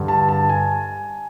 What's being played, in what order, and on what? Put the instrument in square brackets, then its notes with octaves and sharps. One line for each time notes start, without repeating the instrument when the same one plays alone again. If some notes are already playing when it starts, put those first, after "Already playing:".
Already playing: [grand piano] G2 D3
A5
A5
G#5